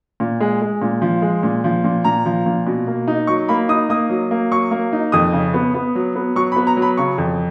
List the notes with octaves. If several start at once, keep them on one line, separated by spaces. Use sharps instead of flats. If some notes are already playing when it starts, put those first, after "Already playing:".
A#2
G#3
G#3
A#2
F3
G#3
A#2
F3
A#2
A#2 A#5
F3
A#2
B2
A#3
D#4
F#3 C#6
A#3 B5
D#4 D#6
A#3 D#6
F#3
A#3
F#3 C#6
A#3
D#4
F2 D#6
C#3
B3
B3
F#3
B3
F#3 C#6
B5
B3
A#5
F#3
B5
C#3 C#6
F2